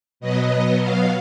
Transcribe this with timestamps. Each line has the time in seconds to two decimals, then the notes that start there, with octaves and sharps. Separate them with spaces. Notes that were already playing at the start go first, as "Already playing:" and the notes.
0.20 B2 F#3 B3 D#5
0.81 F5